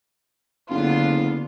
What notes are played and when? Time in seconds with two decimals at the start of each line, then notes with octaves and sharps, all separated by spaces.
0.70 F#1 D3 B3 F4